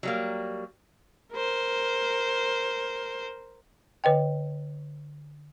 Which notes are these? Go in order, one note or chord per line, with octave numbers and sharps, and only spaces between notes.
F#3 G3 A#3
A#4 C5
D3 B4 D#5 G5